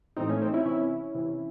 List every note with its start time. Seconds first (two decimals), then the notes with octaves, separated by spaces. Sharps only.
0.17 A2 E3 C4 D#4
0.29 A3 C#4
0.42 C4 D#4
0.54 C#4 E4
0.65 C3 E3 C#4 E4
1.15 C3 E3